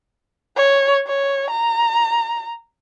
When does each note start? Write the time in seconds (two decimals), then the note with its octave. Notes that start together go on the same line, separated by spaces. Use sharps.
0.57 C#5
1.07 C#5
1.51 A#5